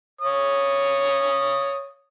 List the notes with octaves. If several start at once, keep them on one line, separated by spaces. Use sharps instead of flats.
C#5 D#6